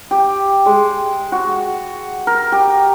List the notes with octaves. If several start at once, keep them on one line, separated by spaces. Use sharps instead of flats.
G4
G#3
F#4
A#4
G4